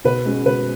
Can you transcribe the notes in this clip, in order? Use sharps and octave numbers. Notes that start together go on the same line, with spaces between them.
B2 B4
G#3 C#4 F#4
B2 B4